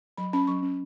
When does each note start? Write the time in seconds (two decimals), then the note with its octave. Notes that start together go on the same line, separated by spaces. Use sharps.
0.17 F#3 B5
0.33 C#4 B5
0.47 F#3 C#6
0.62 C#4